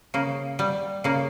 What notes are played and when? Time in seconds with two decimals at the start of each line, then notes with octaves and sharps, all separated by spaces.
0.14 C#3 A#3
0.59 G3
1.04 C#3 A#3